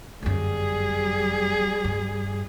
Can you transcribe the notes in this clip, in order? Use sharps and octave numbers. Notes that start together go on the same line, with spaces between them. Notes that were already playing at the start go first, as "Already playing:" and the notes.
G1 F#2 G3 G#4
G2